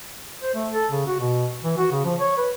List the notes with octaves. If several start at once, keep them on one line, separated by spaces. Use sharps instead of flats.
C5
A3
A4
C#3
F#4
B2
E3
F#4
C#3
F3
C#5
B4